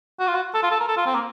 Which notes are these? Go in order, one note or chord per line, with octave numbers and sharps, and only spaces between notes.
F#4
F4
F#4
A4
F4
A4
A#4
A4
F4
C4
A#3